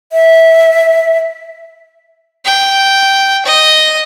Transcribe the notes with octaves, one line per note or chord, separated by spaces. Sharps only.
E5
G5
D#5